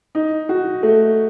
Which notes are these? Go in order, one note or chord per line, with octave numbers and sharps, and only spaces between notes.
D#4
F#4
A3